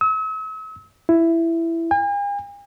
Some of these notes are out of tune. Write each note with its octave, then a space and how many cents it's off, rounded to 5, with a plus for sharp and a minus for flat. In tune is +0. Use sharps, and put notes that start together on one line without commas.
E6 -45
E4 +10
G#5 -45